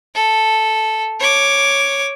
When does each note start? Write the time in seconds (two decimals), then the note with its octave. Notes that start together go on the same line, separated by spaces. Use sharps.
0.15 A4
1.20 C#5 D6